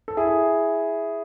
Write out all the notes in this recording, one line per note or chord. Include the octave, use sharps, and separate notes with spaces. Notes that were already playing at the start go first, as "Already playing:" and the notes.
A4
E4 G#4